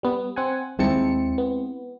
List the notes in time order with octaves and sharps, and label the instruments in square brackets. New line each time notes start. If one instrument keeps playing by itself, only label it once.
[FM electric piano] G3 B3
C4 F#5 G#5
[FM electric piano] D#2 A5 C#7 [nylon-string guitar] G#3 C4 E4
[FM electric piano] B3